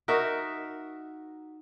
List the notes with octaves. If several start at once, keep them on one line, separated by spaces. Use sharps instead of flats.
D#4 F#4 A#4 E5